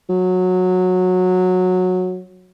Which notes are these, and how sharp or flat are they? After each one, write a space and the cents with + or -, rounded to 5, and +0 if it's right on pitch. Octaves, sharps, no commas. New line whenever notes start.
F#3 -15